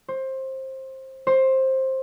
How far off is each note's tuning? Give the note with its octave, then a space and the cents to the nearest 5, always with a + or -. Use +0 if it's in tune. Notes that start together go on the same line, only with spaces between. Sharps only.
C5 +20
C5 +15